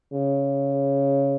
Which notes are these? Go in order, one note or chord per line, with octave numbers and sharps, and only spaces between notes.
C#3